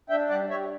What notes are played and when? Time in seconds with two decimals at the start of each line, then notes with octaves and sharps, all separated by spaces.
0.09 D4 E5 G5
0.29 G3 D5 F#5
0.49 G3 C#5 E5